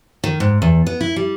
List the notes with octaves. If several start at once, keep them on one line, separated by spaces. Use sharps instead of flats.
D#3
G#2
E2
B3
E4
G3